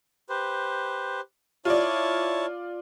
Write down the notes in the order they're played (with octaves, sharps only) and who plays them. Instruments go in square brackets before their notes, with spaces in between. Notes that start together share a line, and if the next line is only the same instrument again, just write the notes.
[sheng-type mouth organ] G4 B4 C5
[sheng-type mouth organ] E4 C#5 A5 [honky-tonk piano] F4 D5